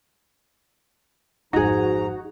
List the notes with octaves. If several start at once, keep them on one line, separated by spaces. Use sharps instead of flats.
G#1 F2 G#2 D#4 F#4 G#4 A#5